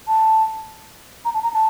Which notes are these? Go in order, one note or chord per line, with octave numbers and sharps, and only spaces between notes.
A5
A#5
A5
A#5
A5